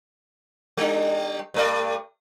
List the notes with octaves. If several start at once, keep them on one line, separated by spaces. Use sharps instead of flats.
G3 D4
G2 A3 D5